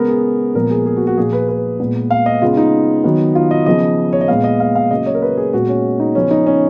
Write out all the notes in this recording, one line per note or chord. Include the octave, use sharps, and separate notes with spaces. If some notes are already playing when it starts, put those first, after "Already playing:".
Already playing: C#3 G#3 B3 A#4
G#4
A#2 F3 G#3 B3 A#4
G#4
G#4
F#4
F#4
A#2 F3 A#3 G#4
B4
B4
A#2 G#3 B3
F5
D#5
C#3 G#3 B3 F4
D#4
D#3 F#3 B3
F4
D#5
C#3 F3 B3 D#5
C#5
D#5
A#2 G#3 B3 F5
D#5
F5
F5
C#3 F#3 A#3 D#5
C#5
A#4
B4
G#4
A#2 G#3 B3 F#4
C#4
D#4
C#3 F3 B3 C#4
D#4
C#4